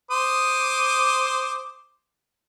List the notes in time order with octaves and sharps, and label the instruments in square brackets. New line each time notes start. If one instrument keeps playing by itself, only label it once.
[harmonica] C5 D6 D#6